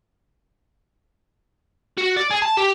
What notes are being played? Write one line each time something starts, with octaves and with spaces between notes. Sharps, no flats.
F#4
D5
G#4
A5
G4